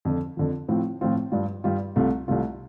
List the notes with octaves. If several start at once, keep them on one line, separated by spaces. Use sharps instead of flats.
F2 D3 F3
F2 D3 F3
A2 F3 C4 F4
A2 F3 C4 F4
G2 G3 F4
G2 G3 F4
C2 C3 A3 F4
C2 C3 A3 F4